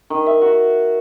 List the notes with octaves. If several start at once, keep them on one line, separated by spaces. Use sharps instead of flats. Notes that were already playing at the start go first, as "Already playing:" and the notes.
D#3
E5
F#4